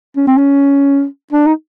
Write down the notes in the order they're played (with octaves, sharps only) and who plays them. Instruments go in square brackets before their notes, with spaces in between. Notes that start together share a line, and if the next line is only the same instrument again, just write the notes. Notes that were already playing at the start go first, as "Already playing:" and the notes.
[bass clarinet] C#4
C4
C#4
D4
D#4